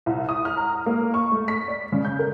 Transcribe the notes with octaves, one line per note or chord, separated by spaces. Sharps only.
C2
D#6
F6
A#5
A#3
C#6
A3
B6
D5
C#3
G6
A#4